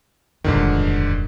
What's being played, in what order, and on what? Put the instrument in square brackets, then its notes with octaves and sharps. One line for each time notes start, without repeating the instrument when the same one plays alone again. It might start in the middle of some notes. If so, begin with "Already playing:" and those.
[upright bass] D#1 F2 [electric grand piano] G#2 D3 D#3